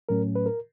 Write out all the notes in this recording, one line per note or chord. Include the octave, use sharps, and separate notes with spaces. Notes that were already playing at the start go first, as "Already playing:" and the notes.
A2 F#3 A3 C#4 A#4
B4
A#4